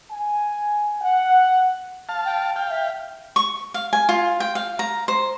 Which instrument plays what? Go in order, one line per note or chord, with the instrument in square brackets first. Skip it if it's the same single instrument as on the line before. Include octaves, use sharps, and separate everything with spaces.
[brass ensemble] G#5
F#5
[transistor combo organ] F5 A5
[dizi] G5
[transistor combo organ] F5 G5
[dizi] E5
[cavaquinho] C#6
F5
G#5
F4
G5
F5
A#5
C5